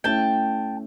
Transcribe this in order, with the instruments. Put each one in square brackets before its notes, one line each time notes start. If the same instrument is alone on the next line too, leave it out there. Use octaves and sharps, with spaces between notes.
[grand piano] A3 C#4 E4 [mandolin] G5 A5